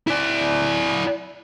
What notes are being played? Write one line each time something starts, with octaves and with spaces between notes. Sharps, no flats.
E4 D5